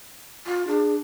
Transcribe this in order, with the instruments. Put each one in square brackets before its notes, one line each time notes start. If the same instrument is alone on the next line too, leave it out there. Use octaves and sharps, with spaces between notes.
[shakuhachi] F4
[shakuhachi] D4 [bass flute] G#4